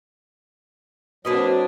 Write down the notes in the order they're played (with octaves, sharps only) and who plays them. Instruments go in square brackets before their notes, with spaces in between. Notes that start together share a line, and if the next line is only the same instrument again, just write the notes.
[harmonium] F#3 [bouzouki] A#3 B4 D#5 [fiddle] C4 D4 [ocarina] F#4